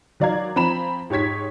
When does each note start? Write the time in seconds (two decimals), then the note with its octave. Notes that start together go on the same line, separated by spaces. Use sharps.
0.20 D#3 F#3 D5 F5 A#5 G#6
0.56 F3 C4 A#5 B5 E7
1.10 G#2 G4 C#5 G#6 B6